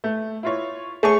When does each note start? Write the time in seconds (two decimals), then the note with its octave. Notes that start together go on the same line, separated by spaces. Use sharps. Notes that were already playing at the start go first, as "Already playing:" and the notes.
0.04 A3
0.43 E4 F4 C#5
1.03 A3 G#4 C#5 A5 C#6